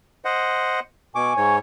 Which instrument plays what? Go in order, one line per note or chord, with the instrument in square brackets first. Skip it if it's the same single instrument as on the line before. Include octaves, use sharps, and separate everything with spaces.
[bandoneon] C5 D#5 F#5
[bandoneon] B2 D6 [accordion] G#5 C#6
[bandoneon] G#2 C#5